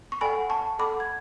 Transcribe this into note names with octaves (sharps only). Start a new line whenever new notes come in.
C#6
A4 D5 F#5 G#5 B5
A5 C#6
A4 D5 F#5 B5 D6
G#6